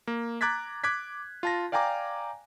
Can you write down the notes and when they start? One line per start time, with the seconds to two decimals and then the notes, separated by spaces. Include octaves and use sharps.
0.07 A#3
0.41 A#5 D6 F#6 G#6 A6 B6
0.84 D6 F#6 G#6 B6
1.43 F4 A5 A#6
1.72 D5 F5 G5 G#5 A#5 D6